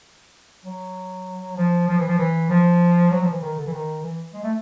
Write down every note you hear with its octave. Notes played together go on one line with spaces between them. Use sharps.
F#3
F3
F3
E3
F3
E3
F3
F#3
F3
E3
D#3
D3
E3
D#3
E3
G#3
A3